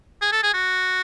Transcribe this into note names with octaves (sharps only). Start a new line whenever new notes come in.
G#4
A4
G#4
F#4